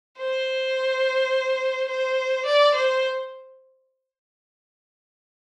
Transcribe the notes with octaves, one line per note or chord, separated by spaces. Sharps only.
C5
C5
D5
C5